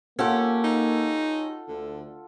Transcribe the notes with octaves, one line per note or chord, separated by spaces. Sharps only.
A#3 C#4 F4 G4 A4 F#5
D#4
D2 D3